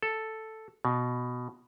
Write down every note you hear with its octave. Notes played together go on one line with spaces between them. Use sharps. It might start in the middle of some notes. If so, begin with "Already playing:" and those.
A4
B2